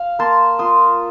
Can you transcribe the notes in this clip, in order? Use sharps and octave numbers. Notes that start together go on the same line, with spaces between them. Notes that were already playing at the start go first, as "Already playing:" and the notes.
Already playing: F5
A#3 A5 C6
F4 C6 D#6